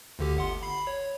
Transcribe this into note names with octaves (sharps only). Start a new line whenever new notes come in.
D2 D3 G4
G1 F#5 C6
B5 C7
C#5